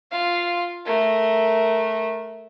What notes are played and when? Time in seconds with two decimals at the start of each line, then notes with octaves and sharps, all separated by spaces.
0.12 F4 F5
0.85 A3 A#4